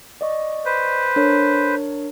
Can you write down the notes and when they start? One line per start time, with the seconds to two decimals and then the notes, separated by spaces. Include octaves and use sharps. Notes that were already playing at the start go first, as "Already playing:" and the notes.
0.21 D5 D#5 C#6
0.65 B4 C5
1.16 D4 A#4 C#5